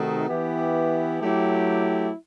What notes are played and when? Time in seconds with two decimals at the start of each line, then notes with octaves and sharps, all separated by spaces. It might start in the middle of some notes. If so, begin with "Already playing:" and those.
Already playing: C3 D#3 A3 D#4 F#4
0.28 E3 B3 E4 G4
1.21 F#3 A3 E4 G4